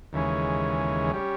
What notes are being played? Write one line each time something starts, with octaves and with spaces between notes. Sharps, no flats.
D#2 C#3 E3 G#3 C#4
G3 C#4